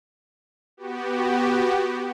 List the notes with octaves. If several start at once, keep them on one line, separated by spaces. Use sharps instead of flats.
B3 F#4 G4